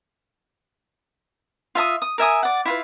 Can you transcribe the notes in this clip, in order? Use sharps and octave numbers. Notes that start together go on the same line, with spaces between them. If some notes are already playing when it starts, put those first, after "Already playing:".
F4 E5 A5 D#6
D#6
A#4 E5 G#5 D#6
D5 F#5
E4 F4 B4